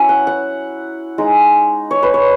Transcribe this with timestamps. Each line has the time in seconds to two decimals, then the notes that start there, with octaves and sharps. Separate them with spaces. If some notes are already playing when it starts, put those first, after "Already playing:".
Already playing: F#3 C#4 E4 E5
0.09 F#5
0.27 F#5
1.18 G#3 D#4
1.91 C#5
2.03 B4
2.14 C#5